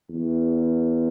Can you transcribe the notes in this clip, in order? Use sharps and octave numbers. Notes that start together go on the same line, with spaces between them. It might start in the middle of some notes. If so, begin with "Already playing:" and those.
E2